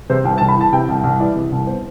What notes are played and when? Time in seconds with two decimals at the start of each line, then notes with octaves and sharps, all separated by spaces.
0.10 C3 C5
0.25 C2 G5
0.38 A5
0.41 C2
0.48 B5
0.57 E3 A5
0.73 C3 G5
0.89 C2
1.04 C2
1.20 E3 D5
1.35 C3
1.52 C2
1.67 B3 C5